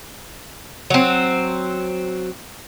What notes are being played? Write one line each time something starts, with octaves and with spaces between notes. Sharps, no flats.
F#3 C4